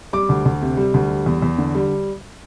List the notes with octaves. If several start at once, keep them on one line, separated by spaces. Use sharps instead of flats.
G3 D6
D2
D2
C3
G3
D2
G3
E2
E2
D3
G3